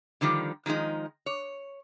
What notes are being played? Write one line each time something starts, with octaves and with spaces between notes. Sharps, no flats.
D3 D#3 F3 G3
D#3 F3 G#3 D#4
C#5